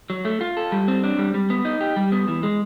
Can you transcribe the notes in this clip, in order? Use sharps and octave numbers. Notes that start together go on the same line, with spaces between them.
F#3
A3
F4
A4
G3
C4
D4
G3
G3
B3
D#4
G4
G3
B3
E3
G#3